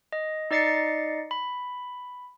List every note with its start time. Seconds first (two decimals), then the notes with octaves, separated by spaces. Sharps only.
0.12 D#5
0.51 D#4 D5 D#5 A6 C7 C#7
1.31 B5